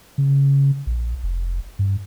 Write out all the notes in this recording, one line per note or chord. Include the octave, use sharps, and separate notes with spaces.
C#3
A#1
F1
G2